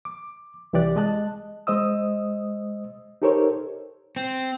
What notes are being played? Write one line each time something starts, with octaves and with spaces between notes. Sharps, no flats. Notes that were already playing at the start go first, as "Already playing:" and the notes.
D6
C2 E3 G4 D5 F#6
G#3 D#5 A5 F#6
G#3 C5 D#5 D#6 E6
D#4 G4 A4 A#4 C5 C#5
C4